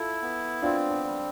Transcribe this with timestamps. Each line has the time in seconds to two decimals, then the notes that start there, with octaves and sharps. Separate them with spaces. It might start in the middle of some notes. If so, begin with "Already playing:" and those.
Already playing: E4 F4 A4
0.22 B3
0.62 C4 D4 F4
0.90 D4
1.04 G3